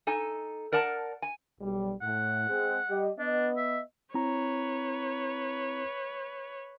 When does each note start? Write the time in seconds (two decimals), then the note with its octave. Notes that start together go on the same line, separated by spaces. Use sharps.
0.07 D#4 A4 G#5
0.72 A#4 D5 F#5 A5
1.22 G#5
1.61 B1 G3
2.02 A2 F#5
2.49 G#3 C4 G#4
2.88 G3 G4 D#5
3.19 B3 D4 D#5
3.57 E5
4.14 C4 E4 B4 C#5 A#5